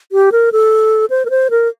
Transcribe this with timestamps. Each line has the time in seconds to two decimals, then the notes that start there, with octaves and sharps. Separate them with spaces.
0.12 G4
0.32 A#4
0.52 A4
1.10 C5
1.25 A#4
1.30 C5
1.50 A#4